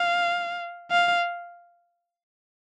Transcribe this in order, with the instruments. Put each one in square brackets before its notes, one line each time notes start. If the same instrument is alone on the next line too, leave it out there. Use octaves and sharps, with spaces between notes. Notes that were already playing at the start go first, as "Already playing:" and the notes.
Already playing: [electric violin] F5
F5